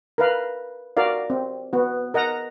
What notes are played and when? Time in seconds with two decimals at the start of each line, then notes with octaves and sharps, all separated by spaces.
0.18 A#4 B4 F5
0.97 F#4 A#4 D5 F5
1.30 C4
1.73 B3 F#4
2.14 A#4 D#5 F#5 A#5